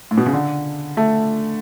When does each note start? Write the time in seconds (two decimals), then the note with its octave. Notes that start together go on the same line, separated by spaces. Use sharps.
0.11 A2
0.17 B2
0.26 C#3
0.33 D3
0.97 A3